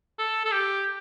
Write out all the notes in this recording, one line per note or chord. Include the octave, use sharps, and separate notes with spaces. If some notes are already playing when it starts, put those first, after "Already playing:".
A4
A4
G4